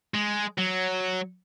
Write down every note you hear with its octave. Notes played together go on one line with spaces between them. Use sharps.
G#3
F#3